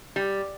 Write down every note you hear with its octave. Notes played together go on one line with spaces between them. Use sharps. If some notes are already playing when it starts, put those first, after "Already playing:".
G3